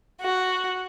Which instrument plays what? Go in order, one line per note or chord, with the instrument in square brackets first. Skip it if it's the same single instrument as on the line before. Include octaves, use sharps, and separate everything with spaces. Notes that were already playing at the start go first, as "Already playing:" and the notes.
[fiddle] F#4